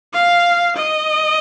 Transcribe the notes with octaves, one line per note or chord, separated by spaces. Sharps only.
F5
D#5